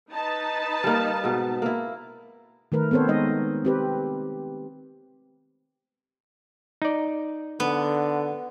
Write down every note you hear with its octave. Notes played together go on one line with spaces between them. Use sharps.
D#4 B4 A5
G3 A#3
G#2 B2
A#3 E4
D#3 A3 A#4 B4
B3 C4 A4 C5 C#5
G#3 D#4 D#5
C4 G4 B4
D#4 D5
D3 B3